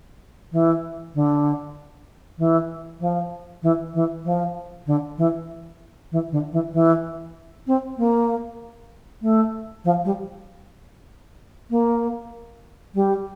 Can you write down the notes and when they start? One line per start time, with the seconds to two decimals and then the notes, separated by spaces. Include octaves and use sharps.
0.52 E3
1.14 D3
2.38 E3
3.00 F3
3.62 E3
3.94 E3
4.24 F3
4.86 D3
5.17 E3
6.11 E3
6.31 D3
6.52 E3
6.73 E3
7.67 C4
7.97 A#3
9.22 A3
9.84 F3
10.04 G3
11.70 A#3
12.94 G3